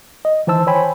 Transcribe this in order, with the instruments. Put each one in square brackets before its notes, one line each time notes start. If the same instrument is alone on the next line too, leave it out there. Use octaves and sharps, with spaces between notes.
[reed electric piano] D#5
D#3 E3 C5 A5 E6
C5 C#5 G5 G#5 B5